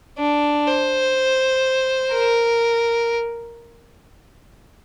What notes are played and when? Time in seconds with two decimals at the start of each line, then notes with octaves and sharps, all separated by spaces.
0.19 D4
0.67 C5
2.13 A#4